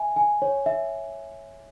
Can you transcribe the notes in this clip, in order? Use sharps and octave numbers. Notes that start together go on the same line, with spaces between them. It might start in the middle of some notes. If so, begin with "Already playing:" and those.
Already playing: E5 G#5
G#5
C#5
E5